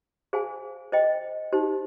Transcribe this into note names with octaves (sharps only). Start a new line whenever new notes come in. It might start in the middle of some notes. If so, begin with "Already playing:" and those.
G#4 C5 F5 G#5
C5 D#5 G5
D#4 G4 C5